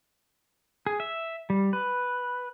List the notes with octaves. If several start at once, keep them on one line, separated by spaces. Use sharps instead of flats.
G#4
E5
G3
B4